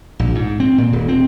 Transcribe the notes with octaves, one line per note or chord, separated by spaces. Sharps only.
A#1
G#2
C4
A#2
D#1
C4